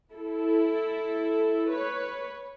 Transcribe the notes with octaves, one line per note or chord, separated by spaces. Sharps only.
E4 A4
B4 C#5